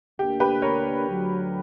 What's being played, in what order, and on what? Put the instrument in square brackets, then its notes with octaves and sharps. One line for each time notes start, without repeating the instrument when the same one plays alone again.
[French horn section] D2 D3 A#3 D4 [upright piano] G4
[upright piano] G4 B4
A#4 C#5
[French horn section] D2 D3 F#3